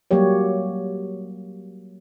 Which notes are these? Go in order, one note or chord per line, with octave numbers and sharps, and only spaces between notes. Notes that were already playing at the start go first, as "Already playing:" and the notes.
F#3 G3 A#3 G4 C#5